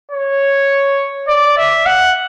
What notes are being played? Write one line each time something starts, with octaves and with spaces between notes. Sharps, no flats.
C#5
D5
E5
F#5